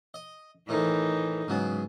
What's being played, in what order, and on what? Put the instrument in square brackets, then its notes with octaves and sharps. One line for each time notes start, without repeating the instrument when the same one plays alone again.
[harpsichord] D#5
[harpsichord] A2 D#3 [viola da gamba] E3 D#4
[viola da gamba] G#2 [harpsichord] C#3 F#3 B3